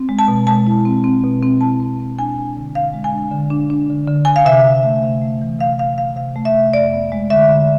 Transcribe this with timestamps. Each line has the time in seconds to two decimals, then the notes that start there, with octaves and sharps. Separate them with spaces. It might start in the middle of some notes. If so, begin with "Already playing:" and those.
Already playing: C4
0.09 G#3
0.19 A5
0.28 B2
0.47 G#3 A5
0.67 E4
0.85 C4
1.04 C4
1.24 B2
1.42 C4
1.61 E4 A5
1.80 C4
2.00 C4
2.19 D4 G#5
2.37 D4
2.56 D3
2.75 D3 F5
2.94 G#3
3.04 G#5
3.13 D4
3.32 D3
3.50 D4
3.70 D4
3.90 D3
4.08 D3
4.25 D3 G#5
4.36 F5
4.45 C3 E5
4.65 C3
4.83 A3
5.03 C3
5.22 A3
5.41 E3
5.60 C3 F5
5.79 C3 F5
5.97 C3 F5
6.16 C3 F5
6.36 A3
6.45 E5
6.55 C3
6.73 F2 D5
6.93 B3
7.12 G#3
7.30 D3 E5
7.50 D3